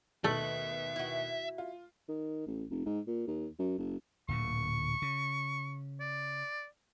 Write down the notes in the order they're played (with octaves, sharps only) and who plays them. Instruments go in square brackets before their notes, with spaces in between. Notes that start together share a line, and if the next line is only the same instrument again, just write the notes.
[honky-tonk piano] D#2 B2 F#7 [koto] A3 [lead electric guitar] E5
[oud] E4 F#4
[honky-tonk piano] F4
[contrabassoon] D#3
A1
F1
G#2
A#2
D#2
F#2
F#1
[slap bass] D1 A#2 D3 [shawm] C#6
[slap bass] C#3
[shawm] D5